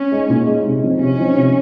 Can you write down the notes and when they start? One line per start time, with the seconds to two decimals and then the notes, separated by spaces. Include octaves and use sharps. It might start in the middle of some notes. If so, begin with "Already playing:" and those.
Already playing: C#4
0.11 G#3 D#4
0.29 A#2
0.47 G#3 D#4
0.64 C3
0.82 F3 C4 D#4
0.99 C3 C#4
1.17 F3 C4 D#4
1.35 C3